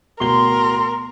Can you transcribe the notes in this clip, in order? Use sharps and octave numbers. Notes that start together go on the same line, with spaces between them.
D1 B2 A#4 C6 G7